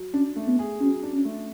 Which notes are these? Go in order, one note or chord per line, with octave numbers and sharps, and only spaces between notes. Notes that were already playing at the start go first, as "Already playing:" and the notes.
Already playing: F#3
C#4 D4
A3
B3
G#4
F#3 C#4
D4
C#4
A3